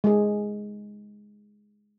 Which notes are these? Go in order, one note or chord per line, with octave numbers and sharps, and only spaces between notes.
G#3 G#4